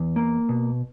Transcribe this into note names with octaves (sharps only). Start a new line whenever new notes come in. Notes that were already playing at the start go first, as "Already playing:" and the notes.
Already playing: E2
A#3
B2